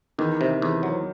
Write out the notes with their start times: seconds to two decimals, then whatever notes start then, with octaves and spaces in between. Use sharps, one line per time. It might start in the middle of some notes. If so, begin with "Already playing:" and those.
0.19 E2 D#3
0.41 C3
0.62 E2
0.83 F#3